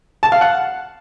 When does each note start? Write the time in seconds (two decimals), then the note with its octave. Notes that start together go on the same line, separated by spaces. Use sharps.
0.23 A5
0.32 F5
0.41 F#5